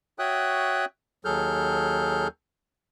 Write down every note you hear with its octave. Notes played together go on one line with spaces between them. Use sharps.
F#4 C#5 E5 G5 D#6 F#6
D#2 F#3 G#4 A4 F6 G6